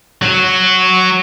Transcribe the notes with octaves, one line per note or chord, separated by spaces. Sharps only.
F#3 F#4